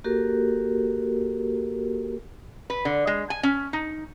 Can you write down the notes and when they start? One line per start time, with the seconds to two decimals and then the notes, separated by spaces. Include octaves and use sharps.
0.04 A#3 F#4 G4 A4 A#4
2.70 B4
2.85 D3
3.07 G#3
3.30 G#5
3.43 C#4
3.73 D#4